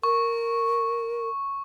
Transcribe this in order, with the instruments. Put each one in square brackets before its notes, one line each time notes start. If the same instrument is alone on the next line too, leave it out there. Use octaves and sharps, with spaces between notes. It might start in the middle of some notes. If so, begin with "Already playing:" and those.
[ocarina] A#4 [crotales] C#6